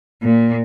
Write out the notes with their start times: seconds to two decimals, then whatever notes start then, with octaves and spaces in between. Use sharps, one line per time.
0.23 A#2